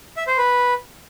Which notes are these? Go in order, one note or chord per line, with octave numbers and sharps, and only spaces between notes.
E5
C5
B4